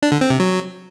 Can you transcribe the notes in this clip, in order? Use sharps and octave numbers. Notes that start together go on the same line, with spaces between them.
D4
D3
C4
C3
F#3